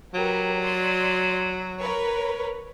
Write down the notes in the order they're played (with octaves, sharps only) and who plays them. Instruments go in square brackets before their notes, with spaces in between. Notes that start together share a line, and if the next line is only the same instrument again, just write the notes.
[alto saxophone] F#3 [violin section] G4 A#4 B4
[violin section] D5 C6
A#4 B4 C#5